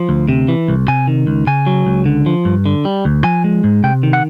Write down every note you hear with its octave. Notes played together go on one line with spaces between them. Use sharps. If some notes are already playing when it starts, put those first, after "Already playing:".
Already playing: F3
D2
C3
E3
C2
C3 G#5
D#3
C#2
C#3 G#5
F#3
C#2
D3
F3
G2
D3
G3
D2
F3 G#5
G#3
G#2
C3 G5
D#3
F#5